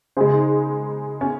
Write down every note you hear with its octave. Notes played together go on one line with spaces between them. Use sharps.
C#3 G#3 G#4 C5
D#4
C#4